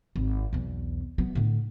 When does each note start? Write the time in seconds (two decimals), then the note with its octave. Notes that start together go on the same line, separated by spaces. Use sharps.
0.16 G#1
0.53 B1 E2
1.18 F#3 B3
1.35 A2 D3